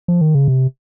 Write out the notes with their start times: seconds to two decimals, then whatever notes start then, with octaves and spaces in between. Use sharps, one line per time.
0.08 F3
0.21 D#3
0.35 C#3
0.48 C3